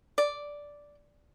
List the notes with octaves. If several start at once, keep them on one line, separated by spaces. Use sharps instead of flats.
D5